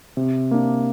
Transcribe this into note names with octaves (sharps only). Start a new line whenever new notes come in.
C3
A#3 D4